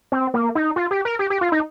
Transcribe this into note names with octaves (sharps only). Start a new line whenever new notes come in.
C4
A#3
D#4
F4
G4
A#4
G4
G4
F4
D#4